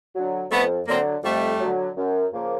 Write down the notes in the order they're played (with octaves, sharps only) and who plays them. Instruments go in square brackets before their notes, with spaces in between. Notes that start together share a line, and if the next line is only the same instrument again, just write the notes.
[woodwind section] D3 F#3
[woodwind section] F2 [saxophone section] A3 B3
[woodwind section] D3 F#3 [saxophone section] A#3 C4
[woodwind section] F2 [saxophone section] G3 A3
[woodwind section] D3 F#3
F#2
C#3 F3 A#3